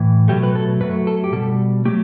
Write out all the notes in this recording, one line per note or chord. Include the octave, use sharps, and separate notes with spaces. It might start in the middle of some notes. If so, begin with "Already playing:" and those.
Already playing: A2 E3
B2 F#3 A3 G4
B4
A4
F#2 F#3 A3 B4
A4
G4
B2 G3 A4
F#3 A3 G4